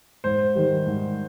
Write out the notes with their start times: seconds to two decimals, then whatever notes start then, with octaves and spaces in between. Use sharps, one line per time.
0.24 G#2 C5
0.55 D#3 G3
0.87 G#2